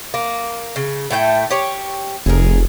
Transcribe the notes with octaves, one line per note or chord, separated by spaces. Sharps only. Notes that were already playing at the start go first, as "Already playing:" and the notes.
A#3
C#3
A2 A3 G5
G4 C#5
F1 G#4 A#4